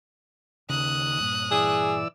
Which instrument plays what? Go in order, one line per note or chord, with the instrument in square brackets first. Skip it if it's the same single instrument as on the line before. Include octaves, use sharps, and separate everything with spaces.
[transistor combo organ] D#2 [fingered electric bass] C#3 [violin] D#6 F#6
[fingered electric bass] G2 A#2
[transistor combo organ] E3 D5 E6 [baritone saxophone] G#4